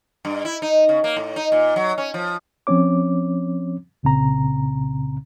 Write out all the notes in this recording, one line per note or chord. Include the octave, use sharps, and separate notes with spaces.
G2
E4
D#4
C#3
A#3
A2
D#4
A#2
F#3
C#4
F3
F3 C4 C#4 C#5 D6
C2 A#2 C#3 C4 A#5